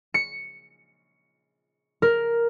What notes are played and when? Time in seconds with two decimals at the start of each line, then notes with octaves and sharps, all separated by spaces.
0.14 C#7
2.02 A#4